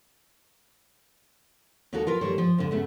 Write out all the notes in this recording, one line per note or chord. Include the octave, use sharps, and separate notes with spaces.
D#2 A#3 D#4 F#4 A4 A#5
F4 A#4 B4
A2 D#3 G3 A#3 C5 C#5
F3
F2 D3
C#3 A3 B3